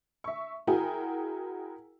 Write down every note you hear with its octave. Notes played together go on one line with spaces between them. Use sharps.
E5 C#6
E4 F#4 G#4 A#4 G5 G#5